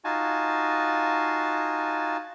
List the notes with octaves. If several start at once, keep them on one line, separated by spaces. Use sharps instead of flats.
D#4 F4 F#4 G#5 A5